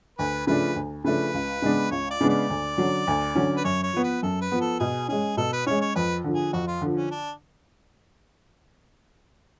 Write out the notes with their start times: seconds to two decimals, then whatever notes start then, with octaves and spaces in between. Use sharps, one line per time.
0.18 D2 B4
0.47 C#3 F3 A3 D4 B4
0.76 D2
1.04 C#3 F3 A3 D4 B4
1.34 C#2
1.62 C#3 G#3 B3 D4
1.91 C#2 C#5
2.11 D5
2.21 C#3 G#3 B3 D4
2.29 D5
2.49 D2
2.77 D3 F#3 C#4
3.07 D2
3.35 D3 F#3 C#4
3.57 B4
3.64 F#2 C#5
3.83 C#5
3.93 F3 B3
4.03 B4
4.23 F#2 A4
4.41 B4
4.52 F3 B3
4.61 A4
4.79 B2 G#4
5.08 G#3 C#4 G#4
5.37 B2 A4
5.53 B4
5.66 G#3 C#4 C#5
5.81 C#5
5.95 F2 B4
6.24 D3 F3
6.34 G#4
6.53 F2 F#4
6.67 F4
6.81 D3 F3
6.96 C#4
7.11 D4